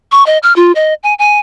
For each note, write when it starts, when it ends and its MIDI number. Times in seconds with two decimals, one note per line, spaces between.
0.12 0.25 85
0.26 0.38 75
0.43 0.54 89
0.56 0.72 65
0.75 0.94 75
1.03 1.14 80
1.19 1.39 80